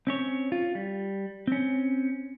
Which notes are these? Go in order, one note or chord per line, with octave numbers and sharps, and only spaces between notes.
C4 C#4 C#5
F4
G3
C4 C#4